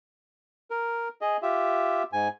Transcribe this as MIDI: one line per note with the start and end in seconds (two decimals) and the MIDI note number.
0.71 1.08 70
1.21 1.37 68
1.21 1.37 75
1.42 2.03 65
1.42 2.03 67
1.42 2.03 76
2.13 2.28 44
2.13 2.28 80